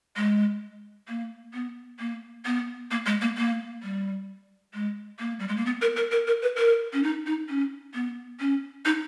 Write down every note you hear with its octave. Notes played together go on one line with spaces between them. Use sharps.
G#3
A#3
B3
A#3
B3
A#3
G#3
A#3
A#3
G3
G#3
A#3
G3
G#3
A#3
B3
A#4
A#4
A#4
A#4
B4
A#4
C#4
D#4
D#4
C#4
B3
C#4
D#4